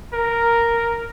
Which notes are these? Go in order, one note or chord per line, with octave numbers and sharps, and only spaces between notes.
A#4